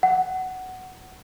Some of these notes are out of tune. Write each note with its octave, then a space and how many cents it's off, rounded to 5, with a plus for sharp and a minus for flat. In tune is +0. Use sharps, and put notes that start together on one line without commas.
F#5 +10